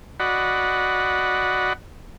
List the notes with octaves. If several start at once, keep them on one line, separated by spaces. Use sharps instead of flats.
F#4 D5 D#5 F#5 B5